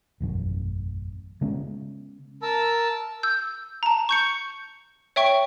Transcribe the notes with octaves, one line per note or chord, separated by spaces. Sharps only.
E1 A1 F#2
C#3 G#3 B3 C#4
A#4 A5 E6
E6 G6
A5 A#5
C#6 G6 C#7
C#5 E5 G5 C#6